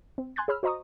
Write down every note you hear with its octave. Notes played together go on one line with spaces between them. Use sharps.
C4
G#5 C6 F#6 G#6 A6
G#4 C#5 B5 E6 F6
F#4 C5 D#5 A#5 C#6 D#6